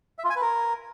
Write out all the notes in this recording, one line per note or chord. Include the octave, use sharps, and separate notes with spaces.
E5
F4
G#5
B4
A#4